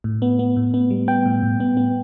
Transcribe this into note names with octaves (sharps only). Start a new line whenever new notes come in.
A2
B3
B3
A2
B3
G3
B3 G5
A2
A2
B3
B3